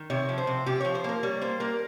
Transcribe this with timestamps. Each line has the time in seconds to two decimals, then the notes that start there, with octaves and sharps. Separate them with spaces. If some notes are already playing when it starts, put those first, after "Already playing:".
Already playing: D#3
0.10 C3 C#5
0.29 F3
0.38 C5
0.47 C3
0.66 C3 G4
0.81 F3 C#5
0.95 C5
1.04 A#3 A#4
1.23 G3 C#5
1.41 A#3 C5
1.60 A#3 A#4